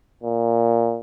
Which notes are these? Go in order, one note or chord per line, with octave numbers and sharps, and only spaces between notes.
A#2